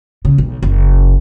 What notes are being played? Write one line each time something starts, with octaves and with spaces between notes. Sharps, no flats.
C#3
B1
F#1